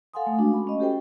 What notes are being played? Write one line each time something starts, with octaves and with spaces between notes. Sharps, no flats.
A4 F5 F#5 G#5 C6 D#6
A3
G#3 C#4 D4 F#4
B5
C#4 D#5
F#4 G4 A4 C5 G5